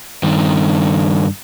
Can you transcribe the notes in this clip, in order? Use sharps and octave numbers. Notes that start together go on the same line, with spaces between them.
G2 D#3